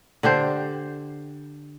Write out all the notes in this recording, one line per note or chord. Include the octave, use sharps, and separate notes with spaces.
D3 D4 G4 C5